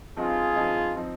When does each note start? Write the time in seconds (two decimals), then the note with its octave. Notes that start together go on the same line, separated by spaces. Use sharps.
0.17 G2 F3 C4 D#4 F4 G#4
0.55 G2 F3 C4 D#4
0.96 F3 C4 D#4